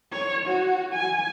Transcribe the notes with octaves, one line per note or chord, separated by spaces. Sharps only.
C#5
F#4
G#5